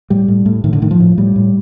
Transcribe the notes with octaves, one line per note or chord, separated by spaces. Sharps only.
A2 G3
A2
A2
A2 D#3
D3
A2 D#3
F3
A2
A2 G3
A2